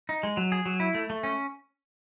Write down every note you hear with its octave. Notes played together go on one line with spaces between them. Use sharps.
D#4
G#3
F#3
G#4
F#3
E4
A3
A3
C#4